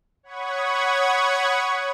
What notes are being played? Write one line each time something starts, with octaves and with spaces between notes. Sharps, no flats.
C#5 F#5 B5 C#6 D#6 G#6